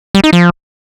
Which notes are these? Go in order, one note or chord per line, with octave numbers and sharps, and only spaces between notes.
G3
D#4
F3